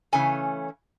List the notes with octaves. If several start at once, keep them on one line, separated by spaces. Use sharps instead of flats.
C#3 E3 A3 C#4 G#5